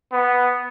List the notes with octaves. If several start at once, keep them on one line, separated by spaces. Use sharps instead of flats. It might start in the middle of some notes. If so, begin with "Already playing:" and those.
B3